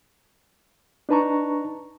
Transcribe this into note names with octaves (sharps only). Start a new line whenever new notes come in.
D4 D#4 B4 A5 A#5 C#6